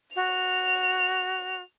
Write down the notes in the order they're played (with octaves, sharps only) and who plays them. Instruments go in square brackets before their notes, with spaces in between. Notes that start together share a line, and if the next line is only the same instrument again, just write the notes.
[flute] F#4 [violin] F7